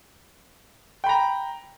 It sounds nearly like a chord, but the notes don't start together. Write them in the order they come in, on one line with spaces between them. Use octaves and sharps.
G5 B5 A#5